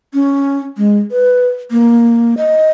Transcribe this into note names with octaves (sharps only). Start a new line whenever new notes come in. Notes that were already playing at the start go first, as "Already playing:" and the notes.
C#4
G#3
B4
A#3
D#5